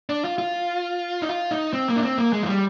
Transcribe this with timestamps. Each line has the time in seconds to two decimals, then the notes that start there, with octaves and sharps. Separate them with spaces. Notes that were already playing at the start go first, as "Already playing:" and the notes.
0.09 D4
0.25 F4
0.38 F4
1.22 D#4
1.29 F4
1.51 D#4
1.73 C4
1.88 A#3
1.96 D4
2.03 C4
2.18 A#3
2.33 G#3
2.42 F3
2.49 G3